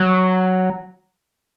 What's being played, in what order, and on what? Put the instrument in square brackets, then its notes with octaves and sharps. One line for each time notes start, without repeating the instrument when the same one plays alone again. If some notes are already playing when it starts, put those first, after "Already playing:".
Already playing: [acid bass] F#3